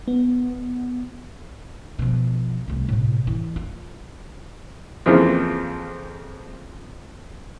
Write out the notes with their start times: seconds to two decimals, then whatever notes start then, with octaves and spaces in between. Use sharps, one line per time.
0.08 B3
1.99 B2 F3
2.68 C2 A3
2.88 A2 C3
3.27 E3
3.56 F4
5.06 F2 C#3 E3 F3 A#3